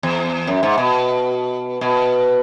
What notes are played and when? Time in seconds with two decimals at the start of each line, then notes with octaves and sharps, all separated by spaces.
0.03 E2
0.47 F#2
0.63 G#2
0.78 B2
1.81 B2